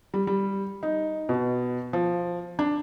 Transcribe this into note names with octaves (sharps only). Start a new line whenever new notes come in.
G3
G3
D#4
B2
F3
D4